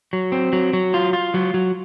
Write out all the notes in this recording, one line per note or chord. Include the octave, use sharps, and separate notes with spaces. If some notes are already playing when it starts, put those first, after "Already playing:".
F#3
C4
F#3
F#3
F4
F4
F#3
F#3